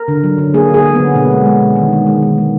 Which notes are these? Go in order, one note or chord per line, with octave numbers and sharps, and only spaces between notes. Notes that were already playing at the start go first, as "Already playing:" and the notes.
Already playing: A#4
D3
F#3
D3
A#3 G#4
D3 G#4
F#3
D3 B3
B2 B3
G#3
G#3
B2
D#3
G#3
G#3
D#3
G#3